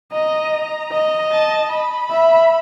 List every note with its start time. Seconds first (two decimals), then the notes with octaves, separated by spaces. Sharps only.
0.13 D#5 A#5
0.92 D#5
1.32 A5
1.71 B5
2.11 E5